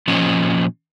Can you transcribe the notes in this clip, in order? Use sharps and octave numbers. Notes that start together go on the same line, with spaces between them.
A#2 F3 C#4 D#5